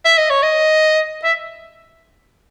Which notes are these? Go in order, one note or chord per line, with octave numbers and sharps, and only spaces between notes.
E5
D#5
C#5
D#5
E5